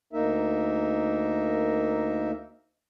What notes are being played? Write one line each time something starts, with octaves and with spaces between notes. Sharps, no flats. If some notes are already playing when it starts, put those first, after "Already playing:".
D2 A#3 D#4 A#4 E5